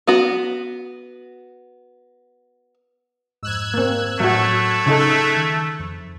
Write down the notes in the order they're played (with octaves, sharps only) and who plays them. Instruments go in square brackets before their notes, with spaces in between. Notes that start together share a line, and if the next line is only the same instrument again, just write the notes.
[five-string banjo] B3 F#4
[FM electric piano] F2 G#2 [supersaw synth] E6 F#6 G#6
[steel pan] A#3 C4
[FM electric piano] A2 [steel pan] F#3 F#4 [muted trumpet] A3
[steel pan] C#3 D#4 A4 [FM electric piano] D#6
[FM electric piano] D#3
F2